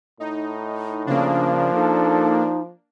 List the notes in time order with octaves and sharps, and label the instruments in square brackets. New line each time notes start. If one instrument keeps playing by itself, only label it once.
[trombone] A2 [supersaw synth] D#4
[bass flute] C#3 [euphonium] F3 [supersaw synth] A#3 D4
[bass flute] D#4 [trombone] A4